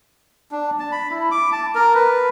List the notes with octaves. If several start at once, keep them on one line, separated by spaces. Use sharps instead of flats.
D4
A5
B5
E4
D6
A5
A#4
B4